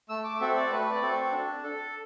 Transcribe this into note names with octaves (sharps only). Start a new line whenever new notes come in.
A3 E6
D6
C4 F#4 A4 E5
D5
A3 B4
D5
C4 F#4 A4
D4
A4